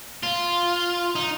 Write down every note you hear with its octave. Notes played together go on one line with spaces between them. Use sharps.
F4
D#4